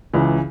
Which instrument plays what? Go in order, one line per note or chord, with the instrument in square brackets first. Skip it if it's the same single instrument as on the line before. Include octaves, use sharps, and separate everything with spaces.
[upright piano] C#2 C#3 E3